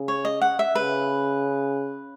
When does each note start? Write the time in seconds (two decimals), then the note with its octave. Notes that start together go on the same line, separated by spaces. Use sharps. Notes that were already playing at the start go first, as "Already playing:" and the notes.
Already playing: C#3
0.08 C#5
0.25 D#5
0.41 F#5
0.59 E5
0.75 C#3 B4